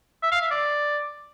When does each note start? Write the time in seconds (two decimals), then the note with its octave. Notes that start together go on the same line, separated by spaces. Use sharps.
0.23 E5
0.32 F5
0.41 E5
0.51 D5